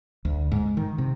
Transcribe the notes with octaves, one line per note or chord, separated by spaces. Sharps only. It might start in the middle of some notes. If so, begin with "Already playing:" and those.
D2
G#2
D#3
C3